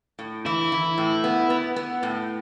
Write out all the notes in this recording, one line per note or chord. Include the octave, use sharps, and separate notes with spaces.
A2
E3 E4
E3
A2
B3
B3
B3
A2